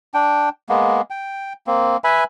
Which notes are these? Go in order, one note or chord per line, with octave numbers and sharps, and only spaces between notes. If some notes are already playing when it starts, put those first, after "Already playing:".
D4 G5
G#3 A#3 B3
G5
A#3 C4
B4 E5 G#5 B5